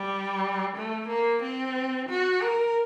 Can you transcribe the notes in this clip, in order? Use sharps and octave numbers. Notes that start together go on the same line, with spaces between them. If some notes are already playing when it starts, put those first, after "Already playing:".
Already playing: G3
A3
A#3
C4
F#4
A#4